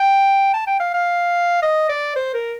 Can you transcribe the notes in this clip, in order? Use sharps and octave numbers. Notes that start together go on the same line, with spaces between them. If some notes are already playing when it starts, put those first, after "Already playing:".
Already playing: G5
A5
G5
F5
F5
D#5
D5
C5
A#4